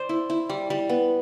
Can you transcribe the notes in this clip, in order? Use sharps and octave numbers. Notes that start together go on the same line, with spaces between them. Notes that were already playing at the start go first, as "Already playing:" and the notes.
Already playing: C5 D5
E4
E4
G3
G3
B3